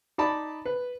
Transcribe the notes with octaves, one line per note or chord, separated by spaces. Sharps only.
D#4 D5 A5 B5
B4